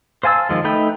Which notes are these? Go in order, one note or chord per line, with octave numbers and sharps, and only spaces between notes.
C5 F5 G#5 A5 E6
D#3 F3 G#3
A3 D#4 B4 G5